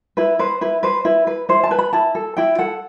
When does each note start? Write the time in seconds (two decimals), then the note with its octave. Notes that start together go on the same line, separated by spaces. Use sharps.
0.17 E4 B4
0.39 B4 C5
0.61 E4 B4
0.83 B4 C5
1.05 E4 B4
1.27 B4
1.49 E4 C5
1.63 A5
1.71 B4
1.78 B5
1.93 E4 A5
2.15 A4
2.37 E4 G5
2.58 A4 F#5